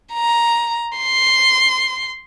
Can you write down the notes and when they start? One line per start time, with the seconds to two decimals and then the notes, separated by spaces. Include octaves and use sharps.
0.14 A#5
0.98 C6